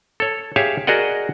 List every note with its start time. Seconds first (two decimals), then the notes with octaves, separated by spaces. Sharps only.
0.20 A4 C#5
0.56 G4 G#4 C#5 E5 F5
0.87 F#4 G#4 A#4 D5 D#5 F#5